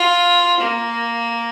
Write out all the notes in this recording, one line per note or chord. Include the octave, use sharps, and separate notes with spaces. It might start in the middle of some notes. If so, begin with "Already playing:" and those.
Already playing: F4
A#3